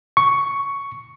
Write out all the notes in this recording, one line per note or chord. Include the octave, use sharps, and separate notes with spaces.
C#6